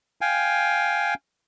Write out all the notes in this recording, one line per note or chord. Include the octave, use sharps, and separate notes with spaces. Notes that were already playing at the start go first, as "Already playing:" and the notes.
F5 G5 G#5